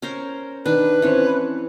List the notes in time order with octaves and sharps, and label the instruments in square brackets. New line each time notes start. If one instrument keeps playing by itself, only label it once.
[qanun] C#4 A#4 C5
[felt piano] D#3 [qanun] D4 [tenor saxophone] B4
[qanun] E3 C#5 [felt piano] C4 C#4 C5